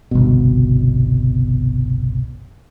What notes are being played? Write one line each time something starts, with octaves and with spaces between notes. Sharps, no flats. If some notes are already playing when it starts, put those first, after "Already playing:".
G1 C2 B2